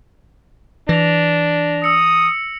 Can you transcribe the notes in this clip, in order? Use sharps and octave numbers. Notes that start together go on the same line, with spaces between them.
E3 D4 A#6 F7
D#6 E6 C#7